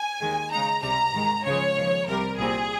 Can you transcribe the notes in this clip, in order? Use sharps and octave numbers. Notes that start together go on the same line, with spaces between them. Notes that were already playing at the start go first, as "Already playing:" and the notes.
Already playing: G#5
D#2 D#3 G#3
C#3 G#3 D#4 A#5
C#2 C3 G3 A#5
G#2 D#3 G#3
C#2 C#3 F3 G#3 C#5
D#2 C#3 F3
C2 C3 G3 A#4
C2 A#2 G3 C4 G#4